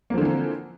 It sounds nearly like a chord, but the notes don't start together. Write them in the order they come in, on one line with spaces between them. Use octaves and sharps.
A#3 F3 D3 E3 C4